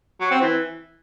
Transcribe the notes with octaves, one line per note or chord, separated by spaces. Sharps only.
F#3
C4
E3